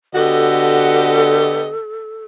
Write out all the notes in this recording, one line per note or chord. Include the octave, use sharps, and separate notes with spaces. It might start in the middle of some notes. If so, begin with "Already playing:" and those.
D3 B3 F#4 G4 A4 D#5